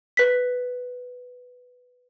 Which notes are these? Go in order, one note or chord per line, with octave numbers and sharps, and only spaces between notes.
B4 B6